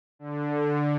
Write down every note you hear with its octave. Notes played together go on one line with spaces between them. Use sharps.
D3